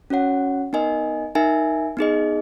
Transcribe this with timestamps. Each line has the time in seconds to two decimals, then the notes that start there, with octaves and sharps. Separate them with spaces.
0.10 C#4 F#4 C#5 F#5
0.73 B3 D#4 A#4 D#5 G#5
1.35 D#4 A#4 E5 G#5
1.97 B3 D#4 G#4 D#5